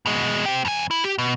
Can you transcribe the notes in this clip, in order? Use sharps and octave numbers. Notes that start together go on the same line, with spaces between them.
B2 G#3
C4 G4
F2 G#5
E4
G4
B2